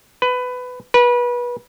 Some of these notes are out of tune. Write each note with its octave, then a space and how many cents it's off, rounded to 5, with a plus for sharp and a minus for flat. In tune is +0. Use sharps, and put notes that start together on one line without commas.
B4 +20
B4 -25